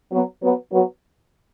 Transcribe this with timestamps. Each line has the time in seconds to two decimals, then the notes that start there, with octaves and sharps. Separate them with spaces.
0.11 F#3 B3
0.42 F#3 B3
0.72 F#3 B3